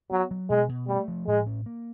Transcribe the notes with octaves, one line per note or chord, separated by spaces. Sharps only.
F#3 B3
F#3
B2 G#3
B2
G3 A3
F3
A2 G#3
C#4
A#3